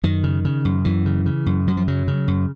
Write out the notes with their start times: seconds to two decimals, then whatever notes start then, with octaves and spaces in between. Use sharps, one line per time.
0.03 F#2 D#3
0.23 C#3
0.45 C#3
0.65 F#2
0.85 F#2 E3
1.06 C#3
1.26 C#3
1.46 F#2
1.67 F#2 F#3
1.77 F3
1.88 C#3 F#3
2.08 C#3
2.28 F#2